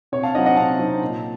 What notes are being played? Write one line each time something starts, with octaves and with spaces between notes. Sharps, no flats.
C3 C#5
F5 A5
F#3 C4 D#4 D#5 F#5
D#5 F#5
C3 F5 A5
F#3 C4 D#4
A#2